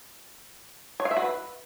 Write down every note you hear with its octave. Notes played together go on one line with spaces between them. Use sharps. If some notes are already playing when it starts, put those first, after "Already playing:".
C#5
F5
E5
F#4
B4